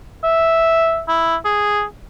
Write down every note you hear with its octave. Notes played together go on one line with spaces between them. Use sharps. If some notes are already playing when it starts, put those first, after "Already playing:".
E5
E4
G#4